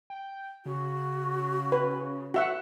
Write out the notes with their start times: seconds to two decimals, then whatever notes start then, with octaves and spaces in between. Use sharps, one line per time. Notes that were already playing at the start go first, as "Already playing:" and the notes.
0.10 G5
0.66 C#3 F#4
1.72 B4
2.34 F#4 E5 F#5